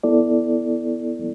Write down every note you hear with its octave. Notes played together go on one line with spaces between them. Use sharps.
B3 E4 A4 D5